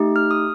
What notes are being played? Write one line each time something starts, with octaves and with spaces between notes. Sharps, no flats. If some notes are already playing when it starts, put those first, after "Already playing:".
Already playing: A3 D#4 G4
F6
D#6